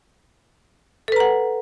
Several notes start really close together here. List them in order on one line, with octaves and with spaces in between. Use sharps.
A4 B4 A#5 F#5